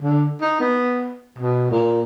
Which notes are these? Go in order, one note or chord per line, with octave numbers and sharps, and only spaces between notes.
D3
D#4
B3
B2
A#2